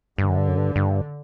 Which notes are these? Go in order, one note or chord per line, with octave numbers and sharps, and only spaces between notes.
G2 D3
F#2
G2
F#2
G2
G2